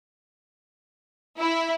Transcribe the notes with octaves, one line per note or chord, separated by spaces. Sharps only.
E4